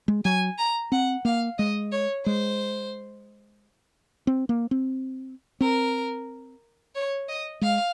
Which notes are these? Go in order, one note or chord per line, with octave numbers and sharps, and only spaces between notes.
G#3
F#3 G#5
A#5
C4 F#5
A#3 F5
G#3 D#5
C#5
G#3 C5
C4
A#3
C4
C4 A#4
C#5
D#5
G#3 F5